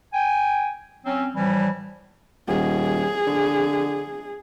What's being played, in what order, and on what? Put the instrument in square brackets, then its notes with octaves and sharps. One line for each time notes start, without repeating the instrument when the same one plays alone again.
[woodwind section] G5 G#5
F#3 C4 C#4
A2 E3 F3 G3
[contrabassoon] D#1 [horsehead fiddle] G#4
[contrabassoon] D3